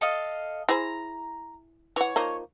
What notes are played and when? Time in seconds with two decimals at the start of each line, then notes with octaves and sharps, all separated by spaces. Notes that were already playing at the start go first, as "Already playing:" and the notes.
0.01 A4 D#5 F5
0.69 E4 G#4 C5 A#5
1.96 E3 C#5 F#5
2.16 F3 A#3 D#4